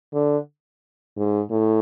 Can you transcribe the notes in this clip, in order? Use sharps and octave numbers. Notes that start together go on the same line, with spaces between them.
D3
G#2
A2